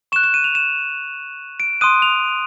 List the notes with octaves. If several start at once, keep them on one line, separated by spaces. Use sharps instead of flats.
C#6 F#6 E7
E7
D#7
F7
E7
D7
C6 D#6 F#6 D#7
F7